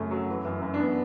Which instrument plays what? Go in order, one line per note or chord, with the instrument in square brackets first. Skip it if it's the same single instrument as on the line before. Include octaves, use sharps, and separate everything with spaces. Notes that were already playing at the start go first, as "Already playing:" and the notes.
Already playing: [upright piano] F#2 C#3 A3 C#4
F#3
E3
F#2
F#2
D4
B3